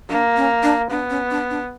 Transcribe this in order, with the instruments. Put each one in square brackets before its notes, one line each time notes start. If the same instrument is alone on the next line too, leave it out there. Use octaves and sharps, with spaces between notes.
[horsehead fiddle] A#3 [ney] D4
[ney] C#4
D4
[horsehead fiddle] B3 [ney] D4
[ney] C#4
D4
D4